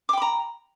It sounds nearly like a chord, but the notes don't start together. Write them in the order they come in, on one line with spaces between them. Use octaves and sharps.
D6 G5 B5 A#5